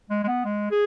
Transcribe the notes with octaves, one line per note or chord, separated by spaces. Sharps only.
G#3
G#3
B3
G#3
G#4